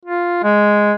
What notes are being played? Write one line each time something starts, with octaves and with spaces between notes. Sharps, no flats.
F4
G#3